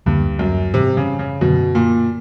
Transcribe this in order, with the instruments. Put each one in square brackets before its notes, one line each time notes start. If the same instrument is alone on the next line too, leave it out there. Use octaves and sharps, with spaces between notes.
[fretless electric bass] D2 D3 G3 A#3 [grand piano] G2
[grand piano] F#2
[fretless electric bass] G#2 E3 G3 [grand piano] C3
[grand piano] C#3
C#3
[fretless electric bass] F#2 D3 F#3 [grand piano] B2
[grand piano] A#2